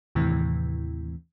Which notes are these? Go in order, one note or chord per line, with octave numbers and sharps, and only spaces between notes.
D#2 A2 C3 E3